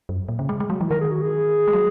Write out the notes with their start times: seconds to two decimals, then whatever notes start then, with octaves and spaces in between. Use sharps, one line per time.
0.09 F#2
0.28 A#2
0.39 C#3
0.49 G#3
0.60 G#3
0.70 F#3
0.81 E3
0.91 D#3 A#4
1.01 G#4
1.11 F#4
1.21 G#4
1.68 G#3
1.73 F#3